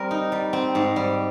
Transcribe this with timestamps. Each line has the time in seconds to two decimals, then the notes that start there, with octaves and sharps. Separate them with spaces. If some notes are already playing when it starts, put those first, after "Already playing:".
Already playing: G3 C4 A#4
0.11 D#4
0.32 G3
0.53 C4
0.75 G#2
0.96 G3